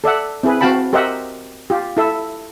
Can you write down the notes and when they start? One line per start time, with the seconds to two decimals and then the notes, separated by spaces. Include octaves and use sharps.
0.04 A4 D5 E5 F#5
0.43 C4 E4 G#4 B4
0.61 C4 F#4 F5 G5 A5 B5
0.93 G4 A#4 C5 D#5 E5 F#5
1.70 F4 G4
1.97 E4 A4 E5